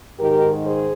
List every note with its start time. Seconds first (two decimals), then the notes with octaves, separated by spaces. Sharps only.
0.19 G#2 D#3 G4 A#4
0.64 G#4 C5